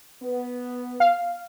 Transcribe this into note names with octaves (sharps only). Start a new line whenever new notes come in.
B3
F5